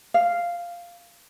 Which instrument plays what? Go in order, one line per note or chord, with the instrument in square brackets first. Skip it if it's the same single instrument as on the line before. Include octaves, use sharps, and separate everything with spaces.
[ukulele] F5